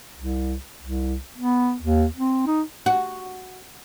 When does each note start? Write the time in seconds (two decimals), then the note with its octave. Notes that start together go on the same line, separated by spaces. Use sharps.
0.16 C2
0.81 C2
1.38 B3
1.82 D#2
2.17 C4
2.47 D#4
2.86 F#4